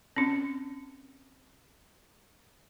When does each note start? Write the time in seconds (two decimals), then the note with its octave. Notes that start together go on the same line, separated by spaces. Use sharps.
0.16 C4 C#4